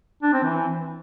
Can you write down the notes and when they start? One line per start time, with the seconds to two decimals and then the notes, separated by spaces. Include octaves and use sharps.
0.23 D4
0.33 C4
0.43 E3